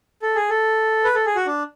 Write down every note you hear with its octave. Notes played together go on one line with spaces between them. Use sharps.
A4
G#4
A4
B4
A4
G#4
F#4
D4